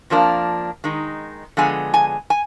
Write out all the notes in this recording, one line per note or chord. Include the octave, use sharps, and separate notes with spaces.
F2 F3 A#3 D4
D#3 G#3 D#4
D3 F3 G#3 B3 G#5
G#5
G#5